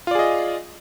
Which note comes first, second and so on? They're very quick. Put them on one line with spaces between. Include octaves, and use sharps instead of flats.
F4 D5 G#4 D#5